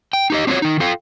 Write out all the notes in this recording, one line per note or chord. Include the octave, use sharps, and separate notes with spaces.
G5
D#4 G4 D#5
C4 D4 F4 F#4 C#5
D#3 D#4
F4 A4 F5 G5